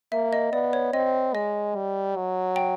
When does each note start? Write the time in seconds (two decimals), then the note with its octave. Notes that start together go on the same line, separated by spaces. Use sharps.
0.12 A#3 E5
0.33 D#5
0.52 B3 D5
0.73 C#5
0.93 C4 D#5
1.34 G#3 D#5
1.76 G3
2.16 F#3
2.56 G5